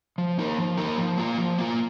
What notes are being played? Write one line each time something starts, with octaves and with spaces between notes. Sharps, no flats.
F3
A#3 D#4 A#4
F3
A#3 D#4 A#4
F3
A#3 F4
F3
A#3 F4